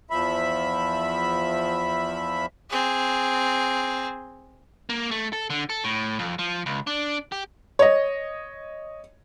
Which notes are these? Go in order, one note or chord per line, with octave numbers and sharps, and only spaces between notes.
E2 F3 E5 B5
C4 G#4
A#3
A3
A4
D3
A4
A2
F2
F3
C#2
D4
G4
C#5 D#5